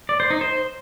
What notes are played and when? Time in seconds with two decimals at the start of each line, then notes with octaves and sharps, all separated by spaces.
0.09 D5
0.20 C5
0.30 D#4
0.41 C5